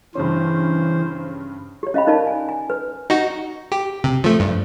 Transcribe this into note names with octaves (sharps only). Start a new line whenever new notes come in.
G2 C#3 E3 C#4 C5
G4 C#5
C#4 D#5 F5 G5 B5
C#4 D#4 A#4 D5 F5 A5
G#5
G#5
B4
D#4 F#4
G4
C3
F3 A3
G2